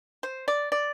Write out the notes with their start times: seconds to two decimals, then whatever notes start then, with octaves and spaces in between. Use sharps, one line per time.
0.23 C5
0.48 D5
0.72 D5